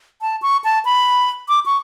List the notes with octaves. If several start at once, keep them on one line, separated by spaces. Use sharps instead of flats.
A5
C#6
A5
B5
D6
C#6